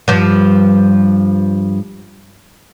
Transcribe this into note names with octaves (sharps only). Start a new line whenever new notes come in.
G2 F3